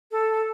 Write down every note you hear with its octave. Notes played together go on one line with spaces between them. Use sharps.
A4